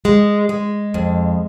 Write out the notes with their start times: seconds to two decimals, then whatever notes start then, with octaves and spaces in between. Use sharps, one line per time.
0.05 G#3
0.49 G#3
0.94 F2